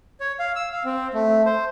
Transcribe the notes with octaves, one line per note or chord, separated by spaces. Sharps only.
C#5
F5
E6
F5
C4
A3
C5